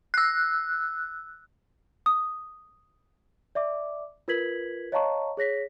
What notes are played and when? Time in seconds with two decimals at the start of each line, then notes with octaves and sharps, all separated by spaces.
0.14 E6 F#6
2.06 D#6
3.55 D5 E5 D6
4.28 F4 A#4 B4 G#6 B6 F#7
4.92 C#5 D#5 F5 A5 A#5 C#6
5.37 G#4 C#5 A#6 B6